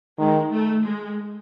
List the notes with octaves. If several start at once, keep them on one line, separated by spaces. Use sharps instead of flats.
D#3 G#3
A3
G#3